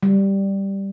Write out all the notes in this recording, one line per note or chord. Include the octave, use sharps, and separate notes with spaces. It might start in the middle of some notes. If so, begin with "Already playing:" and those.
G3